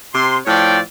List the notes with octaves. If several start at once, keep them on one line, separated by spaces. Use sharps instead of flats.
C3 C6
A2 F3 C#5 D5 G5